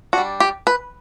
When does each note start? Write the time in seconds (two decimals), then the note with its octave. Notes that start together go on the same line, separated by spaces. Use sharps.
0.13 G3 D4 F#4
0.40 G4
0.67 B4